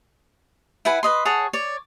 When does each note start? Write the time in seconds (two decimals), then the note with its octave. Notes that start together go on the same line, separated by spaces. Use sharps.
0.85 E4 B4 F#5 G#5
1.03 B4 D#5 C6
1.25 G#4 C#5 F#5 A5
1.53 C#5 D5